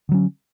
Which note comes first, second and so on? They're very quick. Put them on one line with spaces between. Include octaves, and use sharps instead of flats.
D3 F#3 C#4